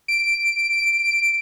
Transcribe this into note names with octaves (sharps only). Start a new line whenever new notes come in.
D7